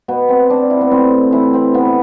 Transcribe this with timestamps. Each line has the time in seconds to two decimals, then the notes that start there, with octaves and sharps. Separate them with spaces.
0.08 B2 B3
0.29 C4
0.50 D4
0.70 E4
0.81 B3
0.91 A2 C4
1.32 E3 E4
1.54 C4
1.74 C3 B3